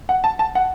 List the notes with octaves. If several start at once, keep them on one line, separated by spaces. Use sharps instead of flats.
F#5
A5
A5
F#5